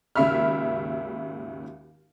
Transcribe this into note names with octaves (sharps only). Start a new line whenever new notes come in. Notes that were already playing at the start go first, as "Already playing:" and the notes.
G#1 D#2 C#3 E5 B5 F6